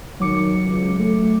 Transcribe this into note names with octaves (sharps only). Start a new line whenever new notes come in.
D#3 F#3 D6 C#7
C#2
A3